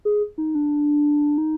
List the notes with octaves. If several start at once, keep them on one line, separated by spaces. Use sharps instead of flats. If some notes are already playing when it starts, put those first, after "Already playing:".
G#4
D#4
D4
D#4